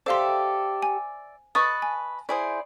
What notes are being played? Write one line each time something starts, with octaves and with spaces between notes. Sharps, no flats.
G4 A4 C5 D5 E5 F5 C6
G#5
B4 D#5 A5 C#6 D#6
G#5
E4 G#4 C5 D5